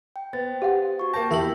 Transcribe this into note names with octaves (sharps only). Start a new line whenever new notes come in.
G5
B3 C5 A6
G4 F5 F#5
F#4 C#6
A#3 G5 A5 A#6
E2 E4 G4 A#4 E5 F#7